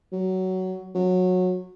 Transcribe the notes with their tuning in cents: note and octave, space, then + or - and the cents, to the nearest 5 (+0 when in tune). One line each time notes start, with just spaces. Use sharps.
F#3 +15
F#3 -20